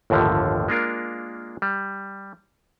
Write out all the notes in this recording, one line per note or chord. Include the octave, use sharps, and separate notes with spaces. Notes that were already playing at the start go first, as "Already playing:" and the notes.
G1 D#2 A2 D3 F3
G#3 A#3 D4 F4 A#4
G3